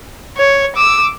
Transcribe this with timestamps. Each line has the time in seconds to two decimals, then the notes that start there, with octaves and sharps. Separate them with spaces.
0.37 C#5
0.76 D6 E6